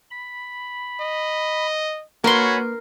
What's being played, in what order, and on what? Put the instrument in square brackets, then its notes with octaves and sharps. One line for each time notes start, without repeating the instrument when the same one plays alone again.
[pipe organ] B5
[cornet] D#5
[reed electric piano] A#3 B4 [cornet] F#4 [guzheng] A#4 C6 [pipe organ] C#5 G#5 B5